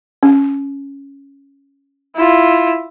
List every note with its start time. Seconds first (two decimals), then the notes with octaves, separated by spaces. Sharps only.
0.23 C#4
2.16 E4 F4